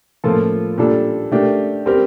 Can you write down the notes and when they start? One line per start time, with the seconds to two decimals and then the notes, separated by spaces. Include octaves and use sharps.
0.24 A2 F3 A#3 F4 A4
0.78 A#2 G3 D4 A4
1.32 A3 D4 G4 A#4
1.86 G3 C4 G4 A#4